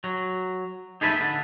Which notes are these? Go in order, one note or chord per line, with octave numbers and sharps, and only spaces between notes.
F#3
D#4 G#4 A4 B4 C5 E5
D3